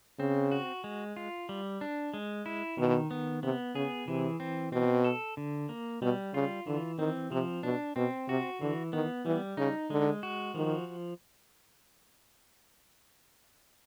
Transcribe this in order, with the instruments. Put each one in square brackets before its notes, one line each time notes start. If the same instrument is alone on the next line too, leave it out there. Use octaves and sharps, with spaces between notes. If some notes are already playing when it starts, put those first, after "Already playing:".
[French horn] C#3 [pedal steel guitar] C4
[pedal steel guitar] F#4
G#3
F4
G3
D4
G#3
E4
[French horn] B2 [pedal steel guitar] D#3
[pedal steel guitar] B3
[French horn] C3 [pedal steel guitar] B3
[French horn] C#3 [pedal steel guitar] G#4
[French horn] C3 [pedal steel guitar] E3
[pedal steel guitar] C4
[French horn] B2 [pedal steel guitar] C4
[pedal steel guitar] A4
D3
A#3
[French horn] B2 [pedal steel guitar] G3
[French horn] C#3 [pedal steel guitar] F4
[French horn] D3 [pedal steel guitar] E3
[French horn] D#3 [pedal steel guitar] C4
[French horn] C3 [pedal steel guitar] F3
[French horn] B2 [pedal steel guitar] D4
[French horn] B2 [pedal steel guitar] C4
[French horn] C3 [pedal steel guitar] F#4
[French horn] D3 [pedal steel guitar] E3
[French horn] D#3 [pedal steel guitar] B3
[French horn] E3 [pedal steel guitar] G3
[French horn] C#3 [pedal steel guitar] D#4
[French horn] D3 [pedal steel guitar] G#3
[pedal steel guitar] F#4
[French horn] D#3 [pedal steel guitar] F3